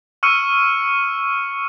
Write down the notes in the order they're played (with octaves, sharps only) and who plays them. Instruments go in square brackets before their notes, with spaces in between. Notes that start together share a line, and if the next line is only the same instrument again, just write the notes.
[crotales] C#6 E6 F6 C#7 D#7